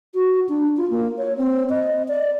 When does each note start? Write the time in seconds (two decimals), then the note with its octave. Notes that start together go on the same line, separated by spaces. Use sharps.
0.14 F#4
0.49 D4
0.77 F4
0.90 A#3
1.18 C#5
1.37 C4
1.70 D#5
2.08 D5